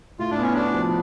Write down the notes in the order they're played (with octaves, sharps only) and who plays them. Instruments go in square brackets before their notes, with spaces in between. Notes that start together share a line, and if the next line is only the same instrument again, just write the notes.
[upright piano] A2 [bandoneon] F4
[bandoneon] D4
[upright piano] B3 [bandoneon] C#4
[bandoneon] D4 [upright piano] F#4
[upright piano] F3